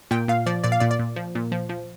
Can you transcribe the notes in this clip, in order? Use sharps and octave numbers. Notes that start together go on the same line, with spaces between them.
A#2 G5
A#2 F5
F3 D5
A#2 D5
F5
A#2 D5
D5
A#2
F3
A#2
F3
F3